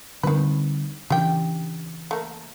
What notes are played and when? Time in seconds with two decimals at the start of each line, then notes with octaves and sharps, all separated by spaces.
0.23 D3 D#3 G3 C4 B4
1.10 C#3 E3 D4 G4 G5
2.11 A3 A#3